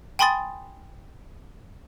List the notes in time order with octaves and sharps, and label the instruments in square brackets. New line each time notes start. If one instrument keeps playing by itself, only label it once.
[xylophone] G5 G#5 B5 C6 D#6 A6